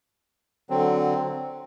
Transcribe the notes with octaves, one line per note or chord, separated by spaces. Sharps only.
D3 F#3 C4